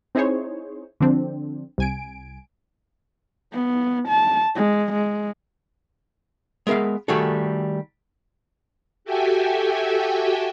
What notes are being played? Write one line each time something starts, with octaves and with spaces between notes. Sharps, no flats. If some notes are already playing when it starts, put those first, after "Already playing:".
C4 D#4 E4 G#4 C5 C#5
D3 F3 C4 D4
C2 G#5 D7
B3
A5
G#3
G#3
G#3 B3 A#4 E5 F5
D#3 G3 A3 F#4 G#4 A4
F#4 G4 A4 E5 G5 G#5